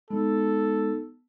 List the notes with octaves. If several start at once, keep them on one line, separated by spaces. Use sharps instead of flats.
G#3 B3 D#4 A4